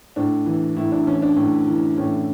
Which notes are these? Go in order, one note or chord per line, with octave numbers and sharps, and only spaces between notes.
A2 D4
E3
A2 E4
D4
E3 C#4
D4
A2
E3
A2 C#4